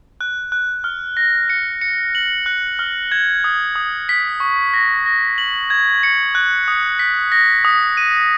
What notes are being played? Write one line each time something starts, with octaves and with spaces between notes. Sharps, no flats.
F#6
F#6
F6
A#6
C#7
C#7
F#7
F#6
F6
G#6
D#6
D#6
B6
C#6
A#6
A#6
F#7
G#6
C#7
F#6
D#6
B6
A#6
D#6
D#7